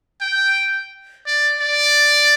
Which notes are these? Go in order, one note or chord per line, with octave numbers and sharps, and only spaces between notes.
G5
D5
D5